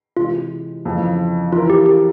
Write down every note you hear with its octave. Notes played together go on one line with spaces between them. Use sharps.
C3 E3 G#3 F4
F2 C#3 E3
E3 A#3 E4 F4 A#4
G4
G4